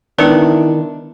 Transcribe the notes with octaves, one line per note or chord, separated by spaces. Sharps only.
D#3 G#3 B3 D4 E4 B4